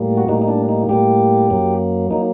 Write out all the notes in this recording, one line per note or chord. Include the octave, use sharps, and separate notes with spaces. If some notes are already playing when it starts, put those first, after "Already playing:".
Already playing: A2 G3 A#3
F#4
A2 G3 A#3 D#4
D#4
D4
D#4
A2 G3 A#3 G4
F#2 F#3 A#3
F#3 A#3 D#4